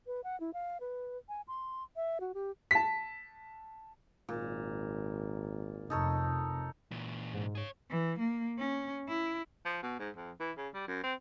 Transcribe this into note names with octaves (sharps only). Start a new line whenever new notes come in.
B4
F#5
E4
F5
B4
G#5
C6
E5
F#4
G4
A5 B6
G#1 A#2
F1 F2 D#4 A4 C#5
A#2 E3
G#2
G#4 C#5
E3
A#3
C#4
E4
F3
B2
G#2
F2
E3
C#3
G3
F#2
C4